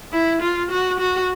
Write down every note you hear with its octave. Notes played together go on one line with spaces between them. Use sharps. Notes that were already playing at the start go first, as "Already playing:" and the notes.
E4
F4
F#4
F#4